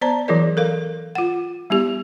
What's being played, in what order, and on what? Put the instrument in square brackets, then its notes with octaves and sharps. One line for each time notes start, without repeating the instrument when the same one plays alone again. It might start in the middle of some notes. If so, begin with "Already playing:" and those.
[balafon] B3 C5 D5 A5 A#5
E3 F#3 E4 G#4 A#4 D5
A4 A#4 F5
F4 F#5
G3 B3 E4 G4